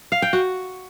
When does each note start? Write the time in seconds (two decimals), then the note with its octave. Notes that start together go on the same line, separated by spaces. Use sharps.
0.12 F5
0.22 G5
0.33 F#4